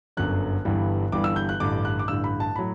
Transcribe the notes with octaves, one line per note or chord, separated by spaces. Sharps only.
G1 F#2 D3 F#3 F#6
G1 G2 E3 G3
G1 G2 E3 G3 D6
E6
G6
F#6
A1 G2 D3 D6
F#6
D6
A1 G2 D3 E6
B5
A5
A2 F#3 B5